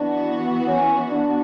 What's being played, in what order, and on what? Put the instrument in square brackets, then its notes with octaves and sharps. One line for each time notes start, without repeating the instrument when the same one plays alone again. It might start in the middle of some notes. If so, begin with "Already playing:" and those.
Already playing: [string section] E3 B3 F#4 [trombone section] D4
[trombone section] C#4
D4